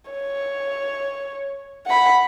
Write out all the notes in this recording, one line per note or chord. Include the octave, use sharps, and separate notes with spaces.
C#5
F#5 B5